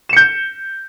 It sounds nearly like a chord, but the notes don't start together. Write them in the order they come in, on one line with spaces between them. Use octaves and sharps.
E7 C#7 G6